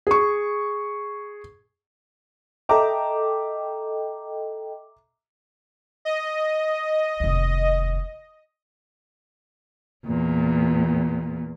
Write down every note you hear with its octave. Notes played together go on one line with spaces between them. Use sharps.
G#4 C#6
A4 D#5 E5 G5 A#5 D6
D#5
F1 D#2
E2 A#2